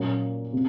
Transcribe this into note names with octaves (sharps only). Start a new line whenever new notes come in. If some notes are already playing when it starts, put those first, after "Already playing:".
Already playing: A#2 F#3 A#3 C#4
C3